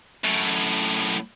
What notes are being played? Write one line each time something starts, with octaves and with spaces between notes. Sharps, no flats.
F#2 A2